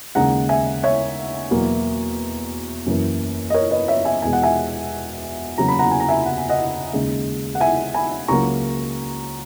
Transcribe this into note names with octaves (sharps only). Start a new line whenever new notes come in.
D#2 C#3 G#3 F#5 A#5
E5 G#5
C#5 E5
E2 B2 F#3 A#3
F#2 E3 A#3
D#5
A#4 C#5
B4 D#5
C#5 E5
E5 G#5
E2 B2 G#3 G#5
F#5
E5 G#5
E2 C#3 F#3 A#3 A#5
B5
F#5 A#5
G#5
A#5
E5 G#5
F#5
G#5
D#5 F#5
D#2 C#3 G#3
F#5
E5 G#5
G#5 B5
C#2 C#3 F#3 A#3 A#5 C#6